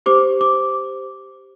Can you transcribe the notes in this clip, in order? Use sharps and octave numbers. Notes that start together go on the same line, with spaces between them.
G4 C5 D6
D6